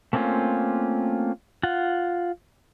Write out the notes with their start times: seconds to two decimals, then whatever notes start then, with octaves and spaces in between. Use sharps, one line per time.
0.13 A3 A#3 C4 C#4 F4
1.63 F4 F#5